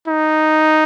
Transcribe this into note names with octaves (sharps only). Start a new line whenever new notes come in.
D#4